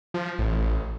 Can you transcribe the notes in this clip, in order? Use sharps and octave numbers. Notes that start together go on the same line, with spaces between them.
F3
A1